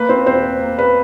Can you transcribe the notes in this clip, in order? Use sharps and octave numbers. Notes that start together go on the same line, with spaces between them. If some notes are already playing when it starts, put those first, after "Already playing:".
Already playing: A#3 B4
C4 C5
E2 C4 C5
A#3
B4